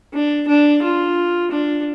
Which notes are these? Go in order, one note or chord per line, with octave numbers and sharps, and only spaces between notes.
D4
D4
F4
D4